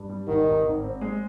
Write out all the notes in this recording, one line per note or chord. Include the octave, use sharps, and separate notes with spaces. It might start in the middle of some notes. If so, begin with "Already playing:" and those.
Already playing: G2
G3
G#1 D#3
G#1
G#1
C4
G#3